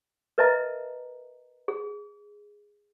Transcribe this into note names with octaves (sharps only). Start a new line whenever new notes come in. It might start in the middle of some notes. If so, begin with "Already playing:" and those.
A#4 B4 D#5 E5 A5 A#5
G#4